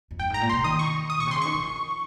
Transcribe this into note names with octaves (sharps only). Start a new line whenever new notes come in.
F2
G2 G5
G#2 A#5
A#2
C3 C6
D#3 D#6
C#6
D#6
A#2 C#6
C3
C#3 C6
D#3 C#6
F3